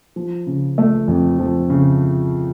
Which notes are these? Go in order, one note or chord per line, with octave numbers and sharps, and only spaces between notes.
F3
C#3
A3
F2
F3
C#3